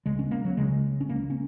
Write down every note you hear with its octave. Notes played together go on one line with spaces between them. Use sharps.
C#2 C#3 G#3
C#4
A#3
F#3
C#2 C#3 G#3
C#4
C#2 C#3 A#3
C#4